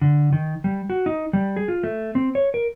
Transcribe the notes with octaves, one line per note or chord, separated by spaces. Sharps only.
D3
D#3
G3
F#4
D#4
G3
G#4
F4
A3
C4
C#5
A#4